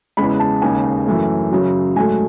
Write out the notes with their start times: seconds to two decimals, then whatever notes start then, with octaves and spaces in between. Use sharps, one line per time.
0.17 E2 C#3 G#3 B5
0.39 A5
0.62 D#2 C#3 G#3 G#5
1.07 F#2 E3 A3
1.51 F#2 C#3 F#3
1.96 G#2 F#3 A3 G#5